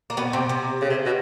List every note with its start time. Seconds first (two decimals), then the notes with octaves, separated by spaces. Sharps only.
0.10 A#3
0.17 B2 B3
0.33 C3 C4
0.49 C3 C4
0.82 C#3
0.90 C3
1.06 B2